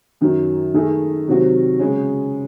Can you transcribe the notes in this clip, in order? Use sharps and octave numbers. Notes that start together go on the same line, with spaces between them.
F#2 D#3 F#3
D#3 A3 D#4 G#4
C3 D#3 F#3 C4 F#4
C#3 G#3 C#4